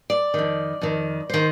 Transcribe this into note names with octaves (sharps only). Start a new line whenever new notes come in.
D5
F2 D#3
F2 D#3
D#3 C5